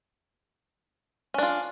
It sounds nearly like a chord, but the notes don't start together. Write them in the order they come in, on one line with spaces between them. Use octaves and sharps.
C#4 D4 F4